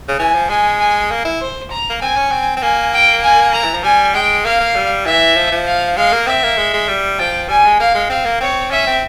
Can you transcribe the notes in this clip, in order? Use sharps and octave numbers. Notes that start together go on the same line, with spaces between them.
C#3
E3 G#5
F3
G#3 G#5
G#5
A#3
E4
C5
A#5
A#3
C4 G#5
C#4
C4
C4
A#3 G#5
G5
G#5
A#5
E3
F3
G3 G#5
G#3 G5
A#3 F5
A#3
G3
E3 E5
F3
F3
F5
G#3 F5
A#3
C4 E5
A#3
G#3
G#3
G3
F3 G5
G3 G#5
G#3
A#3 F5
G#3
C4 F5
A#3
C4 C#5
C#4 E5
C4